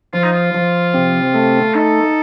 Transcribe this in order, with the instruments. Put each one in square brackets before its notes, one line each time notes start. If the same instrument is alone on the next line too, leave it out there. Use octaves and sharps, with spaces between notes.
[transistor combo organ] F3 [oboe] F4
[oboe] D#4
F4
[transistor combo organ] F3
C3
A3
[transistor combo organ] D#4 [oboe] A4